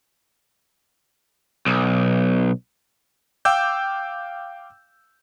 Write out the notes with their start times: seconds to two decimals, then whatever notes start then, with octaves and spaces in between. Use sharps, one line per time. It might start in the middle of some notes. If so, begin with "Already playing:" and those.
1.66 B1
3.45 F5 G5 D6 E6 G6